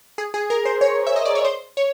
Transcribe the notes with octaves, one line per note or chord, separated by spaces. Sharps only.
G#4
G#4
A#4
C5
C#5
E5
D#5
D5
C#5
C5
C#5